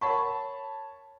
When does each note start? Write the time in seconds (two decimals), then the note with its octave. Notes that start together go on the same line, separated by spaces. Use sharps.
0.01 A#4 C#5 F#5 A5 B5 C#6